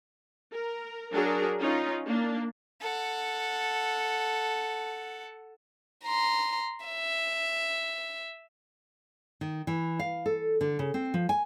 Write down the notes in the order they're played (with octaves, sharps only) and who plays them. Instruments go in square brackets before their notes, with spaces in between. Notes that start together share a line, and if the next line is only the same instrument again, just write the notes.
[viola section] A#4
F#3 D4 G#4 A#4
C#4 D#4 F4
A#3 D4
[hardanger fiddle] A4 F#5
[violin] A#5 C6
E5
[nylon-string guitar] D#3
E3
F5
A4
D3
C#3
C4
F3
G#5